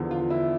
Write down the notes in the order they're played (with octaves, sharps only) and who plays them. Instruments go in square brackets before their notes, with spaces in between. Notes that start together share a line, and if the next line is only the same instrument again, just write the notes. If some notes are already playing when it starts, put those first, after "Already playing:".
Already playing: [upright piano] E2 D3 F3
F4
E4